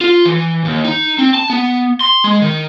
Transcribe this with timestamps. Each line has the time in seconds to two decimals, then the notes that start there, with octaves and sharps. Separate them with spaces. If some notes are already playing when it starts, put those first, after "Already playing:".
0.01 F4
0.25 E3
0.65 D#2
0.84 D#4
1.19 C4
1.34 A5
1.50 B3
2.01 C6
2.24 G#3
2.42 D#3